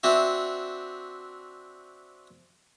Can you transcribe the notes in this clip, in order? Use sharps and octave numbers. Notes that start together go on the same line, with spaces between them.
C4 D4 F#4 E5